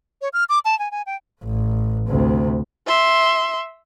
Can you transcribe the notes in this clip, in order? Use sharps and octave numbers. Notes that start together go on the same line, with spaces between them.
C#5
F6
D6
A5
G#5
G#5
G5
A1
D2 C3
E5 C6